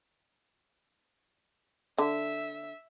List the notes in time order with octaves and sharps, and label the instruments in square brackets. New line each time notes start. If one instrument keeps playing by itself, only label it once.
[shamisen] D3 [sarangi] E5